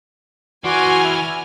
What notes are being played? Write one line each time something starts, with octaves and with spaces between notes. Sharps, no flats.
E3 F#4 D5 G#5 C6 D6 F6
E5